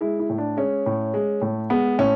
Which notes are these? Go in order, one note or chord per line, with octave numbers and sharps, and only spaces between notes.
G#3 E4
E4
A2
D4
G#3 C#4
A2
G#3
A2
G#3 B3
A2 C#4